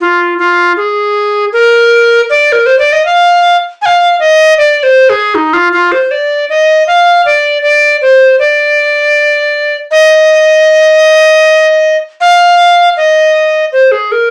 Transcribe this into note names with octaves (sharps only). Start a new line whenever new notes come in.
F4
F4
G#4
A#4
D5
A#4
C5
D5
D#5
F5
G#5
F5
D#5
D5
C5
G#4
D#4
F4
F4
C5
D5
D#5
F5
D5
D5
C5
D5
D#5
F5
D#5
C5
G#4
A#4